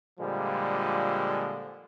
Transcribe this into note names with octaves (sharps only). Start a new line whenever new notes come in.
A#2 D3 F3 G3 G#3